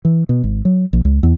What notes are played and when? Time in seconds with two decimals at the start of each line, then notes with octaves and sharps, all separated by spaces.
0.05 E3
0.29 B2
0.44 G#1
0.65 F#3
0.93 A#1
1.05 C#2
1.23 E2